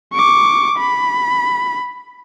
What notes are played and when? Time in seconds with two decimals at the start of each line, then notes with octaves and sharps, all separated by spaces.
0.13 C#6 D6
0.78 B5